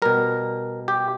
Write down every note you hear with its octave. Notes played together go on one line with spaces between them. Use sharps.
B2 G3 A#4
G4